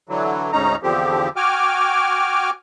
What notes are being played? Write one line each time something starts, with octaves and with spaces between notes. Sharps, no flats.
D3 E3 F#3
D2 G#2 C#4 D#4 A#5
E2 D3 F3 C4 G4
F#4 G5 G#5 D6 F6